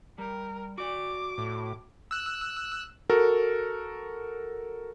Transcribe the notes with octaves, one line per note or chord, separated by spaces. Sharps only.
G3 A#4
F#4 D5 D6
A2
E6 F#6
F#4 A4 A#4